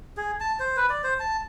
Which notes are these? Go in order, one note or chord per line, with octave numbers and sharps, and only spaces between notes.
G#4
A5
C5
B4
D5
C5
A5